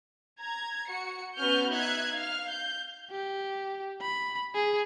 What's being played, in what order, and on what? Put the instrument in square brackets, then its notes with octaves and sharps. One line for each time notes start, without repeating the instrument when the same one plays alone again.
[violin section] A#5 G#6
F#4 C#7
B3 C#4 F#4 B4 F6 G6
D#4 E5 F#6 G#6
F5 F6
G6
[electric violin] G4
B5
G#4